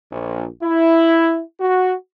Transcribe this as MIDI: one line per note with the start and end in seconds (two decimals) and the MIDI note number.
0.12 0.46 34
0.63 1.41 64
1.60 1.94 66